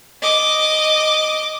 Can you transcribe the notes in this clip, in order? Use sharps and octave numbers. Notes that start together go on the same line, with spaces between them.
D#5 D6